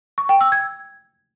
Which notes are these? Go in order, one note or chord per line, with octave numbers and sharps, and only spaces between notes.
C#6
G5
E6
G#6